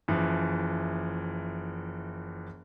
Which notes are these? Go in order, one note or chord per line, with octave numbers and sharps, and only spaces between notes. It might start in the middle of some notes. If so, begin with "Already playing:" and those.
F#1 E3 F3